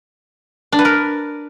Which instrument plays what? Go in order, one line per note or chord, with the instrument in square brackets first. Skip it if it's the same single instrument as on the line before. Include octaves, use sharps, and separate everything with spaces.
[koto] D4
B4
A#4